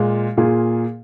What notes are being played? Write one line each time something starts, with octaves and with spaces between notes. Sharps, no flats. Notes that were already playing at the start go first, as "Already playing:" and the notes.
Already playing: A#2 G#3 F4
A#2 A#3 F4 G#4